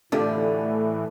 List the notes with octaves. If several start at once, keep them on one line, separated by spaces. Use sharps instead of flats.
A2 D3 E3 A3 D4 F4 G4